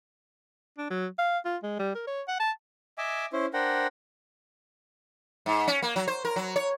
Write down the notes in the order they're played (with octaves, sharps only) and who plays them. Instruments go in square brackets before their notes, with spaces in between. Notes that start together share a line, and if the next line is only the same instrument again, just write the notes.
[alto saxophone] D4
F#3
F5
F4
G#3
G3
A#4
C#5
F#5
A5
[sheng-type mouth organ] D#5 E5 G#5 D6
C#4 E4 C5
D4 A#4 C5 F#5 G5
[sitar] G#2
C#4
A#3
F#3
C5
A#4
F#3
C#5